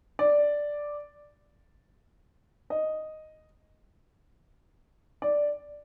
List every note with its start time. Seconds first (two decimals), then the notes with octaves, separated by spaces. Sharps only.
0.19 D5
2.70 D#5
5.22 D5